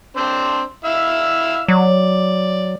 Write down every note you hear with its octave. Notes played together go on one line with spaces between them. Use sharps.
C4 D4 C5
E4 F5 E6
F#3 D5